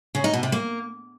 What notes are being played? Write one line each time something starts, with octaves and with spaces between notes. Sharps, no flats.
C#3
D#4
B2
C3
A#3